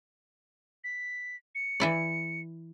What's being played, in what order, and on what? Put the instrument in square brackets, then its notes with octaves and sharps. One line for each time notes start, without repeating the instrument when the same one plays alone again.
[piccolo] B6
C#7
[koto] E3 E4 D5